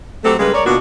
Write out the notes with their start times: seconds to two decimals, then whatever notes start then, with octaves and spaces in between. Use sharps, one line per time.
0.24 F#3 A3 C4 G4 A4
0.39 C#3 G3 G#3 A#3 B4
0.53 A#4 C#5 D5
0.65 B2 A#3 B3 D4 F4 F#4